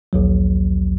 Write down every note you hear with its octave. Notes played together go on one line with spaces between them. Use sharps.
A#1 D#2 F#3